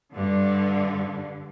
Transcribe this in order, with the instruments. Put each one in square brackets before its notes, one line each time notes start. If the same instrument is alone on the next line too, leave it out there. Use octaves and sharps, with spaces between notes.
[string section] G2 D3